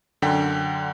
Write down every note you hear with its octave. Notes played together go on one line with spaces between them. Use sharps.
F#2 D3 F#5 G5 B6